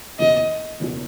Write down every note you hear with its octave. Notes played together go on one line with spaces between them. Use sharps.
F#1 E2 B2 D#5
F#1 E2 B2